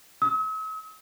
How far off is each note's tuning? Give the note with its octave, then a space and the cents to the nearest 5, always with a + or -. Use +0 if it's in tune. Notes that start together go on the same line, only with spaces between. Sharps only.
E6 -45